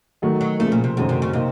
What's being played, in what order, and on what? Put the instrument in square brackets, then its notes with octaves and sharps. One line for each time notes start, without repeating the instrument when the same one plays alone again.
[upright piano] D#3 F#3 A3 D#4
[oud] F#3
[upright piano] C#3 F3 A#3 [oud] A3
[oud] A#2
C3
[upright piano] F#2 D#3 F#3 A3 [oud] C3
[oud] C3
C#3
[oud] C3 [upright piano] A#3 D#4